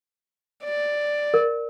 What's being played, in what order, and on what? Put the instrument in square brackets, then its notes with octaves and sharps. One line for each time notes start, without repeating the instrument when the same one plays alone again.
[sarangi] D5
[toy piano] A#4